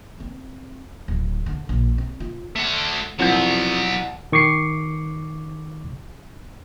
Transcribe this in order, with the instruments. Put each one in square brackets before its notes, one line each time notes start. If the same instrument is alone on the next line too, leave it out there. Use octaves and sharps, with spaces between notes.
[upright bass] C4
D1
D3
A#1
C4
F4
[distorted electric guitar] A3 F#5
[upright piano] C2 G6 [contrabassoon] F2 [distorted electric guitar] F#3 B3
[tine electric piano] D#3 C#6 D6 C7 C#7